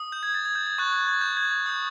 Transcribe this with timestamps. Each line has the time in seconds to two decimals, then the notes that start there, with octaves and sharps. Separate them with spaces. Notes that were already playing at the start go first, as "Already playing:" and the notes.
Already playing: D#6
0.12 G6
0.23 G#6
0.34 A6
0.45 G#6
0.55 G6
0.67 G#6
0.78 C#6 F#6 A6
0.93 G#6
1.07 G#6
1.21 G6
1.37 G#6
1.51 G#6
1.66 D#6 G6